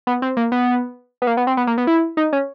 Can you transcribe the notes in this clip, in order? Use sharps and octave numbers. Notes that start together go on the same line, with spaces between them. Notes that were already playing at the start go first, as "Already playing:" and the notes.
B3
C4
A#3
B3
B3
A#3
B3
C4
B3
A#3
B3
E4
D#4
C#4